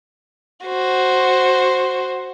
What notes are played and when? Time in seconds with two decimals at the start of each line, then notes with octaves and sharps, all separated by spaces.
0.65 F#4 C5